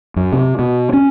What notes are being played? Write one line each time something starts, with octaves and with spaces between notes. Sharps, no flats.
F#2
C3
B2
C#4